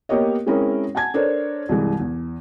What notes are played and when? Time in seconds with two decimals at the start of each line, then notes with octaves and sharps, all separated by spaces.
0.09 A#3 B3 G4 A#4 C#5 D#5
0.47 G#3 C4 C#4 E4 G#4 A#4
0.95 F#5 G#5 A5 G#6
1.14 D4 A4 A#4 C5 C#5
1.69 C2 G2 E3 G3 G#3
2.00 E2